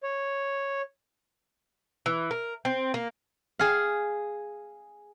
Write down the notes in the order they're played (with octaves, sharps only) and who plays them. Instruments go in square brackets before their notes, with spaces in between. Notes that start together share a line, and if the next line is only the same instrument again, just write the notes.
[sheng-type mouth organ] C#5
[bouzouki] E3
A#4
C4
A#3
[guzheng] G#4 F5